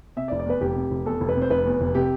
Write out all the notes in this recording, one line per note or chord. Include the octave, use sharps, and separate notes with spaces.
C3 E5
D5
F1
D5
E2 B4
F1 G4
C3
F1
E2 A4
F1
B4
C3
C5
F1 B4
E2
F1
C3 G4